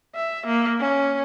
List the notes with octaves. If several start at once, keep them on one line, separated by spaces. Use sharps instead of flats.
E5
A#3
C#4